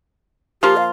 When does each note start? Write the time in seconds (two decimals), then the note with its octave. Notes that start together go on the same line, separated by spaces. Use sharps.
0.62 F3 A#3 F4 G4
0.76 F5